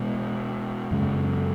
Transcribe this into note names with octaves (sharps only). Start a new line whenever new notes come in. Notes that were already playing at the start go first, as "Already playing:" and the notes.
Already playing: B2 G#3 B3
F#2 C#3 G#3